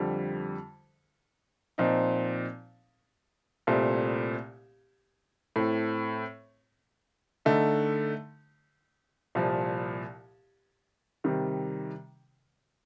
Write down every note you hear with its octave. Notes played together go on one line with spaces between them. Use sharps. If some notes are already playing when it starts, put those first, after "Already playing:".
Already playing: F2 D3 G3
A#2 F3 C4 D#4
C2 A#2 A3 C4
A2 A3 C4
D3 A3 D#4
C2 A#2 F3
C3 D#3 G3